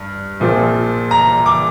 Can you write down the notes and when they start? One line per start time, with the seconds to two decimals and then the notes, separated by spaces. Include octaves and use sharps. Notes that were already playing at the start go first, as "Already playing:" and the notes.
Already playing: G2
0.40 A#1 A#2 F3 C4
1.11 A#5
1.46 D6